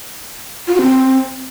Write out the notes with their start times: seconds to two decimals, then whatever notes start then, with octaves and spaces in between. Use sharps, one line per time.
0.67 F4
0.74 F#4
0.81 C4